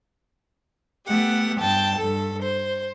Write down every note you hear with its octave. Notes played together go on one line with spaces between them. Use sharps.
A3 B3 G4 F#5
G2 G5 A5
G2 A4
C5